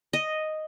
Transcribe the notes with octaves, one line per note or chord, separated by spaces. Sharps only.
D#5